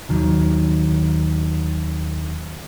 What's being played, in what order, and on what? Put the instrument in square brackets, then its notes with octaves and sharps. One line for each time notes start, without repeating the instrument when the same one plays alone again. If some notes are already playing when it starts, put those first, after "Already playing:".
[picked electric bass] D#2 D#3 F#3